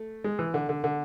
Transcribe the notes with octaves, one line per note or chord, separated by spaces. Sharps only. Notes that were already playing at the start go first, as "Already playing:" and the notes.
Already playing: A3
G#3
E3
D3
D3
D3